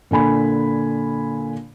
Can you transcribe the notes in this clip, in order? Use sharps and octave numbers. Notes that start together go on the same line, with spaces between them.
A#2 D3 G#5 B5